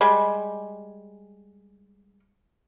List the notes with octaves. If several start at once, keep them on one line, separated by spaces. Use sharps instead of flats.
G3 G#3